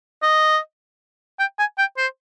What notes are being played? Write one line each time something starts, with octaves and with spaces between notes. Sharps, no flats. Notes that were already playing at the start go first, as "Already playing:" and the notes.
D#5
G5
G#5
G5
C5